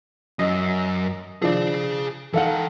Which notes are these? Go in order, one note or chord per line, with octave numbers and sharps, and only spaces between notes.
F#2 D#5
F3 D4 G#4 F5
E3 D#4 A4 F5 F#5